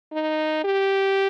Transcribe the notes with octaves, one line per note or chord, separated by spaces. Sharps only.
D#4
G4